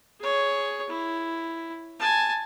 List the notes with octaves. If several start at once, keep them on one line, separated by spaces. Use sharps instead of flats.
G#4 C#5
E4
G#5 A5